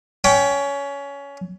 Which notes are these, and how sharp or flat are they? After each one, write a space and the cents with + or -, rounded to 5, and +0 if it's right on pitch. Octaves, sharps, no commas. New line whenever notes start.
C#4 +20 G5 +0